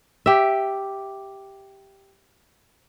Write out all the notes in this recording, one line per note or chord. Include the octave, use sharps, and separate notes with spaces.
G4 E5